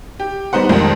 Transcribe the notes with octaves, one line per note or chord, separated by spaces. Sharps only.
G4
G3 B3 D#4 C5 F#5
C2 F2 G#2 D#3